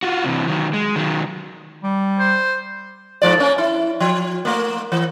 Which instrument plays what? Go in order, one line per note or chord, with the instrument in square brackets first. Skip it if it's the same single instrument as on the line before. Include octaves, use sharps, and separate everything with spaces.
[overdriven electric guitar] F4 F#4
C3 E3
D#3 F#3
G#3
D#3 F#3
[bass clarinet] G3
[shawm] C5
[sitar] G#2 F3 D5
A#3 C#4
E4
F3
A3 A#3
E3